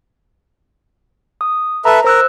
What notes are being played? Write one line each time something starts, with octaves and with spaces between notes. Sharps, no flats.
D#6
A4 B4 E5 A#5
A#4 C5 E6 F#6